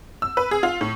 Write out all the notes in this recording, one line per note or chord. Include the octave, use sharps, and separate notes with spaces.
E6
B4
G#4
F4
A2